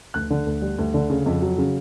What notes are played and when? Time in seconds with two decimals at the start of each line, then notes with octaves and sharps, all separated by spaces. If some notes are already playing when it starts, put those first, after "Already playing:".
0.14 D2 F#6
0.30 D3
0.46 D2
0.62 G3
0.78 D2
0.94 D3
1.10 C#3
1.26 F2
1.42 F#3
1.58 C#3